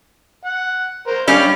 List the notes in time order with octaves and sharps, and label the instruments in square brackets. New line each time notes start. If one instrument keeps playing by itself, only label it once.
[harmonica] F#5
A#4 C5
[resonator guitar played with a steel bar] G3 C#4 [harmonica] D5 F5 B5